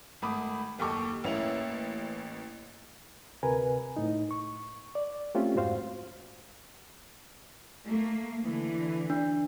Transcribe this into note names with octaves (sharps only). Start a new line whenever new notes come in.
G#1 A3 B5 D6 D#6
F#1 D#2 G4 A4 C#6 D6
A1 A#3 C#4 E4 C#5 F7
D2 C3 A#4 B4 G#5
A2 D#4
C#6
D5
A3 C4 C#4 F4 G4
F2 G#2 F#4 C5 F5
A3 A#3
D3 E3
D4